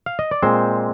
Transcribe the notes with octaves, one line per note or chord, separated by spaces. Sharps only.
F5
D#5
D5
A#2 G#3 C4 C5